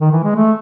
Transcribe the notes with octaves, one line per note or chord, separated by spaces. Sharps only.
D#3
E3
G#3
A3